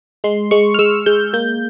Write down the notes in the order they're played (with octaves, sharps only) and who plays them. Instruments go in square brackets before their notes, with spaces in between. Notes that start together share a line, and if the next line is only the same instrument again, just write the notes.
[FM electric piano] G#3 C6
G#3 C#6
F6
G#3 E6
G#3 G6
A#3 G6